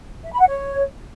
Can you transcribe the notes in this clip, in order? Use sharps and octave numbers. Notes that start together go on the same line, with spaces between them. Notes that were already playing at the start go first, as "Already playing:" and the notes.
E5
B5
F#5
C#5